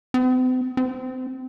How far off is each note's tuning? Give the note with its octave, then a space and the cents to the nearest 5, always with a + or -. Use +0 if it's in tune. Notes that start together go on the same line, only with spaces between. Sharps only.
C4 -45
C4 -25